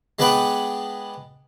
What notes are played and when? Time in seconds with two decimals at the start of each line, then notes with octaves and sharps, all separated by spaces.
0.19 G#3 B3 D4 B4 F#5 G5